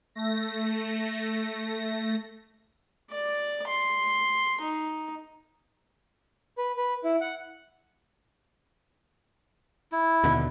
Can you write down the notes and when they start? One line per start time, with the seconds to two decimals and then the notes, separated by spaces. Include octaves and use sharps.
0.15 A3 A#6
3.11 D5
3.68 C6
4.61 D#4
6.58 B4
6.77 B4
7.04 E4
7.21 F#5
9.92 E4
10.24 D#2 B2 D3